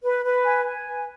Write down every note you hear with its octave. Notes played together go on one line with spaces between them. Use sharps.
B4
B4
G#5
G#5
B4